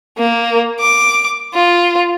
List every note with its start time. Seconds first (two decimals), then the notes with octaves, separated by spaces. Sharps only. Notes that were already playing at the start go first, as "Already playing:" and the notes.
0.18 A#3
0.79 D6
1.54 F4